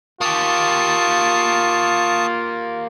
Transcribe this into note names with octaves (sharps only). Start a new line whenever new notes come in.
A#3 F4 G4 A5 C#6 D#6